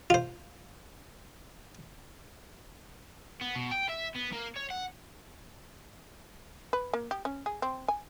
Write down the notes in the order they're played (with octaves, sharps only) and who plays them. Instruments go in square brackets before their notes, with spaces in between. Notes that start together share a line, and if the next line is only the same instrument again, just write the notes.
[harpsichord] F4 C5
[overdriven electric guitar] B3
B2
G5
E5
B3
A#3
C#5
F#5
[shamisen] B4
A#3
G4
C#4
G#4
C4
G#5